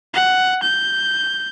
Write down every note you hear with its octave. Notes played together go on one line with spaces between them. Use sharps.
F#5
G6